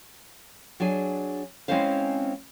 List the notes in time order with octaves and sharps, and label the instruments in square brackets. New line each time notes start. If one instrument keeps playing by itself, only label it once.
[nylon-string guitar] F#3 D4 G#4 G#5
G#3 C4 C#4 E4 C5 F5